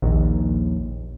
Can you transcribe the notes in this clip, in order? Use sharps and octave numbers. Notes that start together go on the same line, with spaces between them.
A#1 D#2